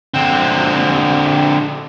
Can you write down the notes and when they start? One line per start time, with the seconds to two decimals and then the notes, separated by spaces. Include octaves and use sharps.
0.14 D3 C4